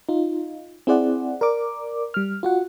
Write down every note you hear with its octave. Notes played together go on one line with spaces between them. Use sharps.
D#4 F4
C4 E4 G#4 C5 D5 F#5
A#4 D5 D6
G3 F6
F4 F#4 F#5